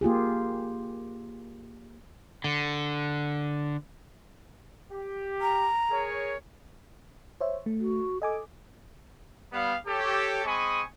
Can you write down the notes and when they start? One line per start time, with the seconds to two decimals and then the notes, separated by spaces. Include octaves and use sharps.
0.01 A#3 F4 G4 G#4
2.44 D3
4.92 G4
5.41 A#5
5.91 G#4 A#4 C#5
7.41 C5 C#5 E5
7.66 A3
7.79 F#4
8.22 A4 D#5 G#5 D6
9.53 G3 B3 F5
9.87 G4 A4 C#5
10.45 G#3 C4 G#5 B5 C#6 D#6